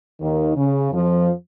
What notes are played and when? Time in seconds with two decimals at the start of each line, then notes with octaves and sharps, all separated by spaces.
0.21 D#2 D#3
0.57 C#3
0.92 F2 F3